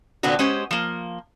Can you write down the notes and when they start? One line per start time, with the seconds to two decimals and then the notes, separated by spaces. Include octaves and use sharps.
0.23 A#2 D3 B3 C4 D4 F#4
0.39 G#3 C#4 G4 C5
0.71 F3 A#3